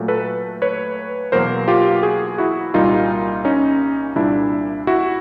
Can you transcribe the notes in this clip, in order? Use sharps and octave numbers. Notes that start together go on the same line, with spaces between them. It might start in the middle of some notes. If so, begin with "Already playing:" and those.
Already playing: A#2 F#3 A3
A4 B4
B4 C#5
E2 B2 F#3 A#3 A#4 C5
F4 G4
F#4 G#4
E4 F#4
C2 A#2 G3 A#3 D#4 F4
C#4 D#4
C2 A#2 G3 D4 E4
E4 F#4